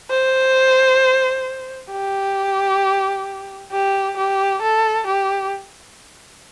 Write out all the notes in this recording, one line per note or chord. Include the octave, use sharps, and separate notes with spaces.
C5
G4
G4
G4
A4
G4